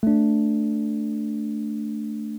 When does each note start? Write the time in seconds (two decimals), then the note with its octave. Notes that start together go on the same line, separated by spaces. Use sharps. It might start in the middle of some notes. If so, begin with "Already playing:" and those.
0.03 A3 D4